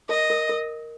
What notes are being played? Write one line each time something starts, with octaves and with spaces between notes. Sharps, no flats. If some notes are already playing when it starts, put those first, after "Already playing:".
A#4 D#5
A#4
A#4